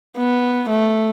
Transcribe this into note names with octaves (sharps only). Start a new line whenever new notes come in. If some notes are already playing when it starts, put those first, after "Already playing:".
B3
A3